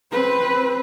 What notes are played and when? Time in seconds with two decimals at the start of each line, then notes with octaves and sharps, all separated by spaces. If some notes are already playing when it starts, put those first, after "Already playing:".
0.12 C4 B4